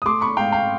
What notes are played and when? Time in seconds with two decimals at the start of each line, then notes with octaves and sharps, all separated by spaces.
0.02 D#6
0.06 A3 C6 D6
0.21 B5 C#6
0.37 G#2 F5 G5
0.52 F5 G5